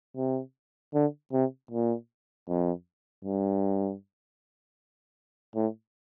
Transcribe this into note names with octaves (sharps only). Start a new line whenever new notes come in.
C3
D3
C3
A#2
F2
G2
A2